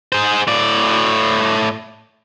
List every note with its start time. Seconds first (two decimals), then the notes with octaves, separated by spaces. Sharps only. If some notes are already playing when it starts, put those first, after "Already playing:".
0.12 G#4 C5
0.47 A2 D5